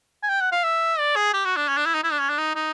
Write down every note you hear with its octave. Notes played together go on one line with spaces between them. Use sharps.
G#5
G5
F#5
F5
E5
D5
G#4
G4
F#4
D4
C#4
D4
E4
D#4
E4
D4
C#4
D4
D#4
D#4